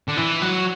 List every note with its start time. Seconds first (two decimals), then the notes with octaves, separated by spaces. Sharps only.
0.08 D3
0.17 E3
0.41 F#3